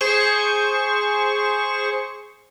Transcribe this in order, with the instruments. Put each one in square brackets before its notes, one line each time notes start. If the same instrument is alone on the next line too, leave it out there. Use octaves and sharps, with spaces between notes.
[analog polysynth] G#4 C5 C#6